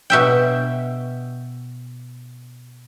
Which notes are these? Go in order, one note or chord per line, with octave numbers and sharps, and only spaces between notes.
B2 E5 G5